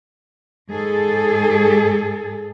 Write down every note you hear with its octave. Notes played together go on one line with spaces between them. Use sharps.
G#2 G#4 A4